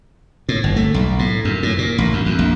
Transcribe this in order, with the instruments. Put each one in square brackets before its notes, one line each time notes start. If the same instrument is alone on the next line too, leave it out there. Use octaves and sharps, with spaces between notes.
[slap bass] A2
G1
A3
B1
A2
F#2
A2
A#2
A1
F#2
F2
A#1